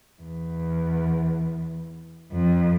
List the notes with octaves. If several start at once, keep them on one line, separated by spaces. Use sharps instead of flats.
E2
F2